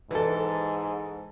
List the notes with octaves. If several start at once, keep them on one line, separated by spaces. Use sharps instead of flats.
G#2 E3 A4